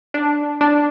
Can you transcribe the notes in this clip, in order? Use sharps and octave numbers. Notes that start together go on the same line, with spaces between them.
D4
D4